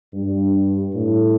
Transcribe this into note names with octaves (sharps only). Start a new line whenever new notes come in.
G2
A2